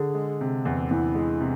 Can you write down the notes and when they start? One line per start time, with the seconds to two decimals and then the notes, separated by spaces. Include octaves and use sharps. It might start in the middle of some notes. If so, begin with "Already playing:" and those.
Already playing: D3 G#4
0.15 G#3
0.41 C3
0.65 E2
0.91 E2 E4
1.15 G#3
1.41 C3